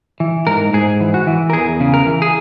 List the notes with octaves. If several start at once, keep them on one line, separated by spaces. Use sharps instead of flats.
E3
G#2 A#4
G#2 G#4
E3
F#4
E3
A#4
E2 G#4
C#3
A#4
E3
G#4